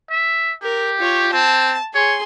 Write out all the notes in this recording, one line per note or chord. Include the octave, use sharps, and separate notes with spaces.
E5
G4 A#4
F4 C#5
C4 A5
G#4 C#5 C6